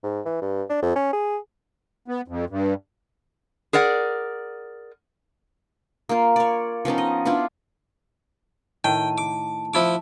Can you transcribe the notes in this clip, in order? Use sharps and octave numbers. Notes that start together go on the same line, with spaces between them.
G#2
E3
G2
D4
F2
C#4
G#4
B3
F2
G2
G#4 A#4 D5 F#5
A#3 F4
C#5 D5
F3 B3 C#4 D#4
D#5
B3 D4 E4 F4
A2 D#3 G5 A5
D6
F3 E4 D6